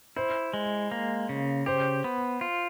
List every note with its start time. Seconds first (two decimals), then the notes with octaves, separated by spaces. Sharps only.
0.16 E4 C5
0.54 G#3
0.91 A#3
1.29 C#3
1.66 G4 C5
2.04 B3
2.41 F4